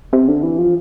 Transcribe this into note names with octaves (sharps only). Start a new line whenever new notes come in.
C3
D3
E3
F3